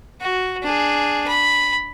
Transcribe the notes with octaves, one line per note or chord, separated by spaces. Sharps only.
F#4
D4 G#4
B5